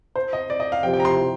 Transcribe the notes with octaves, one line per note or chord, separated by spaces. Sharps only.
C5
D#5
D5
D#5
F5
C3 F3 C4 G4 C5 G5
G5
A#5
C6